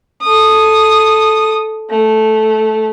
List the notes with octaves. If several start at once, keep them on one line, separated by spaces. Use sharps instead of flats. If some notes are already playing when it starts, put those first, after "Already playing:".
A4 D#6
A3